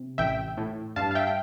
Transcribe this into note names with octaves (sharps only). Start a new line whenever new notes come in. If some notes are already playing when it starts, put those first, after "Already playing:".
Already playing: C3
A1 E5 G5
A2
G2 F5 A5
F5
E5 G5
G5